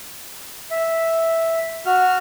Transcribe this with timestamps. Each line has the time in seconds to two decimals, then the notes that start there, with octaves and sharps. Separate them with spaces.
0.71 E5
1.86 F#4 F6